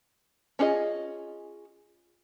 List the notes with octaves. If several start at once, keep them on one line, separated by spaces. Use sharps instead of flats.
C#4 D4 F4 G#4 D#5